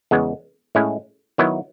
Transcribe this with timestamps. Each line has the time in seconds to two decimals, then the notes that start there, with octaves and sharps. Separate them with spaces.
0.11 E2 C#3 G#3 B3
0.75 A2 G#3 C#4 E4
1.38 D#3 F#3 B3 E4